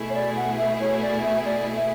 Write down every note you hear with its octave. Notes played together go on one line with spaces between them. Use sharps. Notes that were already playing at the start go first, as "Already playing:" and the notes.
Already playing: B2 A3 E4 G#4
C#5
D5
F#5
E5
C#5
D5
E5
D5
E5